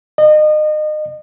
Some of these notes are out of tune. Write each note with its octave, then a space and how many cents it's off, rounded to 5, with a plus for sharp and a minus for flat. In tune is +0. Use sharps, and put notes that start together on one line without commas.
D#5 -30